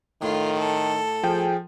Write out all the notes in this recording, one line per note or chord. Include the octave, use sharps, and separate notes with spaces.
A2 D#3 F4
A4
F3 G#4 G5